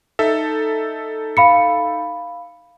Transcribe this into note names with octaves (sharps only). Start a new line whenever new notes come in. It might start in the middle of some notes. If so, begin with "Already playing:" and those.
D#4 A4 E5
F5 B5 C#7